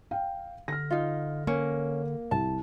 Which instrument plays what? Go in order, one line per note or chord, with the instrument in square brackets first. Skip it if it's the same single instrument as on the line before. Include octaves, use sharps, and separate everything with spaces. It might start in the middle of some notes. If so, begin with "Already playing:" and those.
[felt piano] F5 G5
[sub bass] D3 [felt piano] F6 A#6
[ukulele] D#4 F4
[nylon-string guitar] A#3 [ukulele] C#4
[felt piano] C2 [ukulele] A5